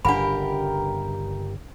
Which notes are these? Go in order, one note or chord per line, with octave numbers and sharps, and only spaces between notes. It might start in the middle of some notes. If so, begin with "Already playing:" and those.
G1 G2 C#3 D4 G4 A#4 F#5 B5